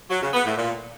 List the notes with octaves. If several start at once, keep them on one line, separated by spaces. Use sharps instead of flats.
F#3
C#3
B3
A2
A#2